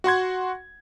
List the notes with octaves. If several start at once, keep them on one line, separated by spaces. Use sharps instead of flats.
F#4 F#5 C6 G#6